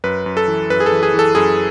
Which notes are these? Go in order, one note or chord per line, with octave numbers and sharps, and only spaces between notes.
F#2 B4
F#2
A4
E3
F#2 B4
G#4
A4
E3
G#4
E3
A4
F#2 G#4